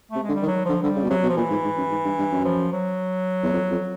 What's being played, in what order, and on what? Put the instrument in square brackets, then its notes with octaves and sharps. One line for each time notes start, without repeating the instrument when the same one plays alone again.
[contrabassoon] C3 [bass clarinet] A3
[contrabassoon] D3 [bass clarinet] G#3
[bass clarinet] G3
[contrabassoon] D#3
[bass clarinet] F#3
[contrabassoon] D3 [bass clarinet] F3
[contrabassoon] D3 [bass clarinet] G3
[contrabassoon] C#3
B2
[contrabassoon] C3 [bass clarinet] F#3
[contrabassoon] B2
[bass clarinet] F3
[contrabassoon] A#2 [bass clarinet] E3
[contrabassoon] G#2
G#2
F#2
G#2
G2
G2
F#2
[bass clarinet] F3
F#3
[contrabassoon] E2
F2
F2